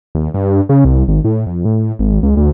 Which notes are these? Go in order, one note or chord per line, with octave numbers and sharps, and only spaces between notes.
D#2
G2
C#3
C2
G#1
A2
F2
A2
G#1
C#2
D2